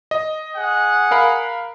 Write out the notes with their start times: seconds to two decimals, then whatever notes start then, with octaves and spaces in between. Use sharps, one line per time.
0.11 D#5
0.56 G#4 F#5
1.11 A#4 F5 B5